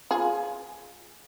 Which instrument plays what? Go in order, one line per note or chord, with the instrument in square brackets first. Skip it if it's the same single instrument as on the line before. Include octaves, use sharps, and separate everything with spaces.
[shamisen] F4 G#4